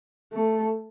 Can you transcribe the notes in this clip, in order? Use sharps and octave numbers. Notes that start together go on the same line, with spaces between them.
A3